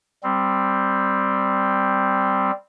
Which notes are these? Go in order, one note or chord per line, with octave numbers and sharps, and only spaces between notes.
G3 C4